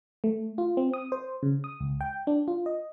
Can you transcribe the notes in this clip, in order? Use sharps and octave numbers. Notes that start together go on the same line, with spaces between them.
A3
F4
C4
D#6
C5
C#3
D#6
C#2
G5
D4
F4
D#5